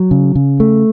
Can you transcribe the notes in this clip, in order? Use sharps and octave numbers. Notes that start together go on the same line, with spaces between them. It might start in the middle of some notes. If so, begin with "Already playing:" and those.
Already playing: F#3
C#3
C#3
A3